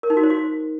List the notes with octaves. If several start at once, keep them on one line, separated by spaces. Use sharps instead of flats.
A#4
D#4
F#4
C5
F#4